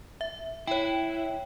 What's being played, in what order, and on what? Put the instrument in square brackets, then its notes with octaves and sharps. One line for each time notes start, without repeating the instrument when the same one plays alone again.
[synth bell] E5
[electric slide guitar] E4 [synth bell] C#5 G5